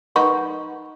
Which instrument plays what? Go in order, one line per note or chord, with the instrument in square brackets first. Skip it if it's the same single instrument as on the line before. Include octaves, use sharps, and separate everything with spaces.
[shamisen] D#4 A#4 B4 [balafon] F#5 [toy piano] C#6